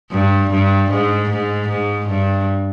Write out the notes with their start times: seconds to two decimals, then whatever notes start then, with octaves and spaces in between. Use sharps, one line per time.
0.11 G2
0.51 G2
0.91 G#2
1.30 G#2
1.68 G#2
2.08 G2